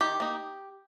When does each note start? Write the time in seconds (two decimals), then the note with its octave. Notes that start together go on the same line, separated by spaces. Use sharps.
0.01 D#3 G4
0.20 A#3 D#4